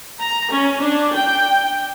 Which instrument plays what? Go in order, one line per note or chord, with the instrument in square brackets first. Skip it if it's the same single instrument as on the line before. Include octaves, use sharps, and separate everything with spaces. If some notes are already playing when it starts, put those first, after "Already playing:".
[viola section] A#5
C#4
D4
G5